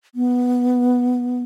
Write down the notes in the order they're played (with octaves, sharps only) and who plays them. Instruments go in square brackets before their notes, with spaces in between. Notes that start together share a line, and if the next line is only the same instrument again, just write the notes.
[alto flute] B3